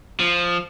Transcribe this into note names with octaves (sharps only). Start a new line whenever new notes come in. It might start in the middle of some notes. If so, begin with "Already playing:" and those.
F3